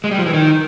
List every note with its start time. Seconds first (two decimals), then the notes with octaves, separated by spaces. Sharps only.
0.04 G#3
0.11 G3
0.19 F3
0.26 E3
0.34 D#3